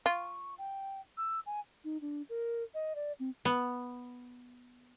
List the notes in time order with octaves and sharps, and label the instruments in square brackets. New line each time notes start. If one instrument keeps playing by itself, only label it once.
[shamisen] F4 [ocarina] C#6
[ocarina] G5
E6
G#5
D#4
D4
A#4
D#5
D5
C4
[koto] B3